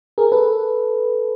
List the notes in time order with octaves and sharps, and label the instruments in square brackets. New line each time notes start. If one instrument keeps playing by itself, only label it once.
[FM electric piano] G#4 A#4
A4 B4